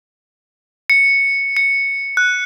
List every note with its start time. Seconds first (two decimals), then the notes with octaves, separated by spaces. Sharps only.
0.90 C#7
1.57 C#7
2.17 F#6